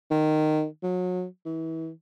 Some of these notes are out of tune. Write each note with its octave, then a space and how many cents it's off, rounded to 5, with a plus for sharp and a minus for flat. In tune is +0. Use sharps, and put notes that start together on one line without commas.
D#3 -15
F#3 -30
E3 -30